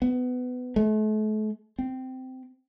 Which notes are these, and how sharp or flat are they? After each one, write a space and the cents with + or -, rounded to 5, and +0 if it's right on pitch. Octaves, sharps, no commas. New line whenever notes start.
B3 +20
A3 -40
C4 -15